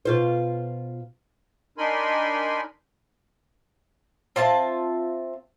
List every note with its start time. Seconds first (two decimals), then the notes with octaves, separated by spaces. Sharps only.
0.05 B2 F4 C5
1.78 D4 D#4 A#4 G#5 B5 C6
4.36 C4 F4 E5 A5